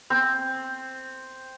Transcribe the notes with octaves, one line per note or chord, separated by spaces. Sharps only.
C4